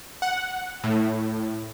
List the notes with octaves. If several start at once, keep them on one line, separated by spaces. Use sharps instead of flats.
F#5
A2